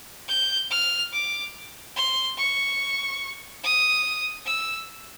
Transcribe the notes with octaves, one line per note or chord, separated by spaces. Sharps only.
G6
F6
D6
C6
C#6
D#6
E6